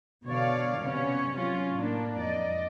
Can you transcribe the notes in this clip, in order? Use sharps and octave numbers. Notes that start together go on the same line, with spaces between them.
B2 D3 C#5 D5 F5
C3 B3 C#4 C#5
F#3 C#4 F4
A2 A#3 D4
F2 D5 D#5